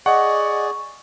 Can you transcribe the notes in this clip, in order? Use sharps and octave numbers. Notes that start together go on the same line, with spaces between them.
G#4 D5 D#5 F#5 C#6